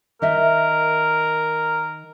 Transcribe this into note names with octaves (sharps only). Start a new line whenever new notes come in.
D#3 A#4 D#5 E5